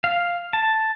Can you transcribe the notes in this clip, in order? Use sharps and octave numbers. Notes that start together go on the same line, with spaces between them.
F5
A5